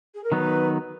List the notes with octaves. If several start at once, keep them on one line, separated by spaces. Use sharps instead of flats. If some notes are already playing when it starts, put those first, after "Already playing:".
G#4
A#4
D#3 F#3 B3 D#4 B4